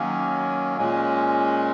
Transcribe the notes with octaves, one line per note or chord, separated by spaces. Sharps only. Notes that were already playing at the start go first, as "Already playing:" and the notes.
Already playing: D#3 F#3 A#3 C#4
A#2 G#3 C#4